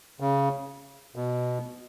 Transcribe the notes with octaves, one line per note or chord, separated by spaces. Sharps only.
C#3
B2